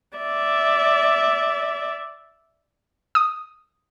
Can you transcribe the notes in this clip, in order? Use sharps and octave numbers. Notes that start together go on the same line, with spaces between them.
D5 E5
D#6